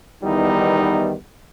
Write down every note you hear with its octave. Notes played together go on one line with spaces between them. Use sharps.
E2 D#3 G3 B3 D#4 E4